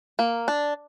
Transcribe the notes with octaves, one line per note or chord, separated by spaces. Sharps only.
A#3
D4